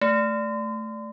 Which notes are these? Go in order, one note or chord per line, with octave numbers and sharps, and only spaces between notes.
A3